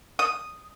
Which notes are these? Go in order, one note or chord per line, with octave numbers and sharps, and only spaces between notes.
D#6